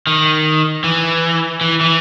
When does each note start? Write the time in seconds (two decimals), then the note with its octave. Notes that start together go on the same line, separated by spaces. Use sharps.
0.07 D#3
0.84 E3
1.61 E3
1.81 E3